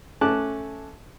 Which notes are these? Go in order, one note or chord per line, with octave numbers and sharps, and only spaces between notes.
A3 C#4 A5 D6 F#6